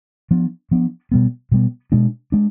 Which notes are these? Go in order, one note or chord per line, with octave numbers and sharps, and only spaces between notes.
F3 B3 D4
F3 B3 D4
B2 G3 B3
B2 G3 B3
B2 G#3 D4
G#3 D4